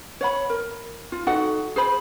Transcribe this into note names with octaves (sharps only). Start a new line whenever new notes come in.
C#5 F#5 B5
A#4
F4
D#4 F#4 A4 F#5
G#4 C5 B5